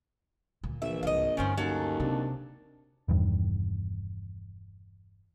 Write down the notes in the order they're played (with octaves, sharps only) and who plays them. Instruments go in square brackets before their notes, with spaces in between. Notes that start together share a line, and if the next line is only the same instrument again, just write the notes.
[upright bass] D2 A#2
[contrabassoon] A#1 [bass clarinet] E3 [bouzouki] E5
[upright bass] C2 G#2 [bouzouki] D#5 F5
[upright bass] D2 G2 [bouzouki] D#3 F3 C4 [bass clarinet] C#4
[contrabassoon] D#2 [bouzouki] F#3 A4 [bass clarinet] C#4
[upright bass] C3 [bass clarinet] D4
[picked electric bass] E1 E2 G2 D#3